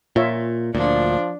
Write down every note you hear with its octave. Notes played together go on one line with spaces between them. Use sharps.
A#2 F4 C#5 E5
D2 A#2 F3 D4